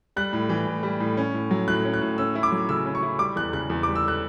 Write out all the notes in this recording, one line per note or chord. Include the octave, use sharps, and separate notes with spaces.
G3 F#6
A2
E3
A2
G3
A2
C#4
A2
F#3
A2 F#6
C#4
F#6
A2
C#4 E6
E4
D6
F#3
C#3 E6
C#4
C#6
E4
G3 D6
E2 F#6
C#3 F#6
E2
D6
G3
E6
F#6